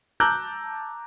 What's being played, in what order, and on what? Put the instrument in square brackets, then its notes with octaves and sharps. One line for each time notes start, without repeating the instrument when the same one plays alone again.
[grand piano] A5 A#5 D6 E6 F#6 G6